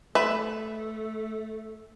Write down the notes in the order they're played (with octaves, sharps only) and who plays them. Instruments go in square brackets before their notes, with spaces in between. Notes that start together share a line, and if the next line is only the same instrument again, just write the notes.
[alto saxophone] A3 [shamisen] B4 [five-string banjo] E5